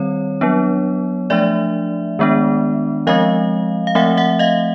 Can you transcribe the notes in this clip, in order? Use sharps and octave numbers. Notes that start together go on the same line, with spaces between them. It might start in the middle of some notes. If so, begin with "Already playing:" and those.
Already playing: D#3 G3 C4 C#5
F#3 B3 D4
F3 A3 D4 D5 E5
D#3 G#3 B3 D4
F3 G#3 C4 D#5 F5
F5
F3 A3 C4 E5 F#5
E5 F#5
D#5 F5